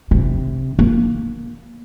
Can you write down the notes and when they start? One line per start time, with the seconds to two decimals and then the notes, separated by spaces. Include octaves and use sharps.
0.11 C3
0.79 A#3